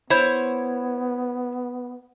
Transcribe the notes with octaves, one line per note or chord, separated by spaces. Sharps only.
B3 E4 C5 C#5